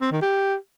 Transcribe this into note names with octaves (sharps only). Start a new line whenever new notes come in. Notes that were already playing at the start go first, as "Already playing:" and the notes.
C4
D#3
G4